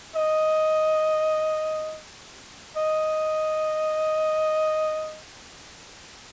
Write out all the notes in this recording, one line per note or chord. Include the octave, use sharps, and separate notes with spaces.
D#5
D#5